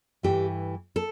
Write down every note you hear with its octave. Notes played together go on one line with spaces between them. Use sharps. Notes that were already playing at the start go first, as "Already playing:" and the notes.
G2 E3 A3 G4
A4